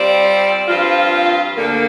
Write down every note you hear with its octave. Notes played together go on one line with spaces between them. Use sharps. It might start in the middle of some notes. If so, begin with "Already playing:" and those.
Already playing: G3 C4 F4 D5
G2 F3 C4 F4
D2 D3 A#3